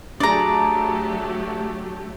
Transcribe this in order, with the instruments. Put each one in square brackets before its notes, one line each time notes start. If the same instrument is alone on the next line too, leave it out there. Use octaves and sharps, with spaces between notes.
[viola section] F#3 A3 G4 [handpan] D4 G#4 [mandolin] D5 A#5